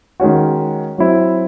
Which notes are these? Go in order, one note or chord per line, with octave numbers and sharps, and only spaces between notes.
D#3 G#3 C#4 F#4
F#3 C4 E4